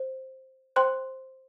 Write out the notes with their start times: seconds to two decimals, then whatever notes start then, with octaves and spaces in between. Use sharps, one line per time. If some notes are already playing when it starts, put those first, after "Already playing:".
Already playing: C5
0.76 C5 G5 C6 F#6